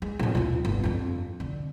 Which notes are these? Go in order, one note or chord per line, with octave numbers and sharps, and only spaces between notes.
G#3
A#1 F2
D#2 F4
G1 C#2
F2 D4
D3